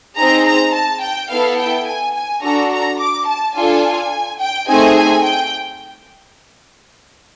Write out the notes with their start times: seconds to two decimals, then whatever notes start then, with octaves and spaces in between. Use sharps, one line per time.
0.17 C4 D#4 G#4 A#5
0.45 A#5
0.73 A5
1.01 G5
1.29 B3 E4 A4 F5
1.58 G5
1.86 G#5
2.14 G#5
2.42 D4 F#4 A4 A#5
2.71 A#5
2.99 D6
3.27 A5
3.55 D4 F4 A4 G#5
4.39 G5
4.68 A3 C4 D#4 G#4 G#5
4.96 G#5
5.24 G5